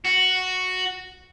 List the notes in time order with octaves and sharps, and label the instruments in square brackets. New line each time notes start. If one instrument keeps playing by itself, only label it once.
[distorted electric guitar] F#4